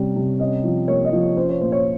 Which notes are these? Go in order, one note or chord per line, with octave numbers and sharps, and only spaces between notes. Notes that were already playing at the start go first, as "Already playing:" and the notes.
Already playing: C3 G3 C#4
C3
C#4 D#5
F3
A#3 C#5
D#5
F3
C#4 C5
C#5
A#2 C5
C#5